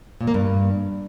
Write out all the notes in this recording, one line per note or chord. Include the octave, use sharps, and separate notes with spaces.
A#2
A#3
G2